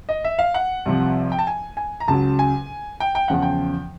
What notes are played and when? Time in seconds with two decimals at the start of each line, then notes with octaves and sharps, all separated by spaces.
0.09 D#5
0.24 E5
0.39 F5
0.54 F#5
0.85 C2 C3 F3
1.32 G5
1.39 A5
1.47 G#5
1.77 G#5
2.00 A#5
2.08 C#2 C#3 F#3 A5
2.39 G#5
3.00 G5
3.15 G5
3.28 E2 C#3 F3 F#5
3.42 G5